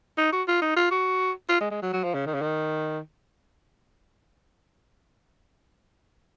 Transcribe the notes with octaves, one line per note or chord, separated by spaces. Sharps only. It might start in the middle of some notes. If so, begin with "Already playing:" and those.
D#4
F#4
F4
D#4
F4
F#4
F4
G#3
G#3
F#3
F#3
F3
C#3
D#3
C#3
D#3